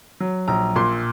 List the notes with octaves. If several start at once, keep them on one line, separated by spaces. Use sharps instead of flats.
F#3
A#1 A#5
A#2 C6